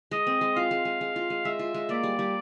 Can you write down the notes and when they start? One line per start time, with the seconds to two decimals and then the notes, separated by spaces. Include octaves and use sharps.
0.11 G#3 D#5
0.27 C4
0.41 G#3
0.56 F4 F5
0.71 G#3
0.85 G#3
1.01 G#3
1.16 F4
1.30 G#3
1.45 G#3 E5
1.59 F4
1.74 G#3
1.89 A#3 D5
2.03 G3
2.19 G3